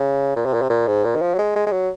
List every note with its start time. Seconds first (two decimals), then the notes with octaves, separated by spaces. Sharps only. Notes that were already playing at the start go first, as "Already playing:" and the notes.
Already playing: C#3
0.36 A#2
0.45 C3
0.53 A#2
0.62 C3
0.70 A#2
0.87 G#2
1.04 A#2
1.16 D#3
1.21 F3
1.34 F#3
1.38 G#3
1.55 G#3
1.66 G#3
1.72 F#3